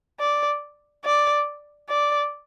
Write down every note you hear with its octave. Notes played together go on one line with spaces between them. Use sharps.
D5
D5
D5